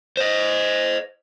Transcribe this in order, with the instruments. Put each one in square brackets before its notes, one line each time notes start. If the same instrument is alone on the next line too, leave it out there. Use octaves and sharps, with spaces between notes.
[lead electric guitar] C5 D#5